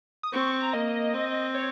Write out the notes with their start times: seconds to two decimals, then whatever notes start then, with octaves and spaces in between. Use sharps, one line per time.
0.23 D#6
0.33 C4 C#6
0.47 C#6
0.60 A#5
0.73 A#3 D#5
1.14 C4
1.55 C#5